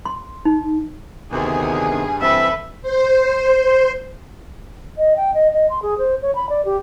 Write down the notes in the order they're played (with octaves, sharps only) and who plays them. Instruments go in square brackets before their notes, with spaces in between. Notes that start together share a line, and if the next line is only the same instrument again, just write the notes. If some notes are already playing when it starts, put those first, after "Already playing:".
[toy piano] C6
D#4
[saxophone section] D2 [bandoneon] C3 D#3 B3 [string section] G#4
[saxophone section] G2
[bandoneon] E3 C4 [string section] A4 B4 [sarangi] E5
[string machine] C5
[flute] D#5
G5
D#5
D#5
C6
G#4
C5
C#5
B5
D5
G4